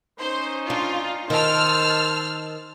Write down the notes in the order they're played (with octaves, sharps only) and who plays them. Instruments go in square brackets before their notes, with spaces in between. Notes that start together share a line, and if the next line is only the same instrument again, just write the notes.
[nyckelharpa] C#4 D#4 [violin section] C5
[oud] D4 [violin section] F4
[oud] D#3 [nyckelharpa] C5 [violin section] A5 E6 F6